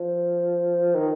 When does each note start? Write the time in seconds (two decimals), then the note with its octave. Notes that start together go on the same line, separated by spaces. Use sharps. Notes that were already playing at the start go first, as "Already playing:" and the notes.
Already playing: F3
0.95 D#3